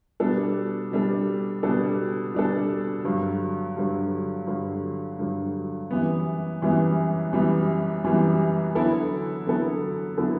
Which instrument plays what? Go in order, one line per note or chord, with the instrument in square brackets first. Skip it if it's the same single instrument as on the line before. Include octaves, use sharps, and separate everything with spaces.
[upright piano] B2 G3 D4 A4
B2 G3 D4 A4
B2 G3 D4 A4
B2 G3 D4 A4
G2 D3 F#3
G2 D3 F#3
G2 D3 F#3
G2 D3 F#3
F#2 E3 G3 B3
F#2 E3 G3 B3
F#2 E3 G3 B3
F#2 E3 G3 B3
D3 F#3 B3 E4 A4
D3 F#3 B3 E4 A4
D3 F#3 B3 E4 A4